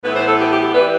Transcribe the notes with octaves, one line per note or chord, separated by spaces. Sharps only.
A2 E3 B3 E4 B4
C5
A4
G4
G4
G4
E3 G3 B4